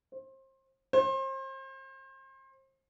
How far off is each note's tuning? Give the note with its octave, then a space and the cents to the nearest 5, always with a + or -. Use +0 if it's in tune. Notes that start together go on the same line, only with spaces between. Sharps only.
C5 +30
C5 +35